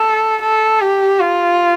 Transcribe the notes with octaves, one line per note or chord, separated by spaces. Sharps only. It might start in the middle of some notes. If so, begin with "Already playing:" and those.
Already playing: A4
A4
G4
F4